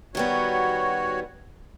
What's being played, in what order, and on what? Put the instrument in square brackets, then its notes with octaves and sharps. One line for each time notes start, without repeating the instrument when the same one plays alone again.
[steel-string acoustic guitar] D#3 G3 B3 [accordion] F#4 C#5